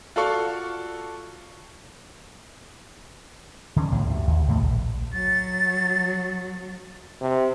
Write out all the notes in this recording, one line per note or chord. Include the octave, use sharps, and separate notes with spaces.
F4 F#4 A4 D5 F5 C#6
D3 C#4
B1 A2
D2 G2
D#2
C#2 A2 D#3 A3
A#1
F#3 A6
C3